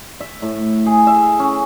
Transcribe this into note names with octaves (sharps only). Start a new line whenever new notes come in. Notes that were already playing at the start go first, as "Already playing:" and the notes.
E5
A2
G#4
E5
C#4